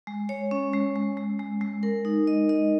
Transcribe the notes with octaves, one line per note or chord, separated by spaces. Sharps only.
G#3
C#5
C#4
G#3
G#3
G#3
G#3
G#3
A#4
D#4
D#5
D#5